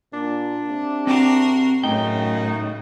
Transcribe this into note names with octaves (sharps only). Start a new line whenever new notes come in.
A#2 D4
C3
C4 F#4 A#4 G5 A5 C6
F#2 A2 C#3 D#4 G5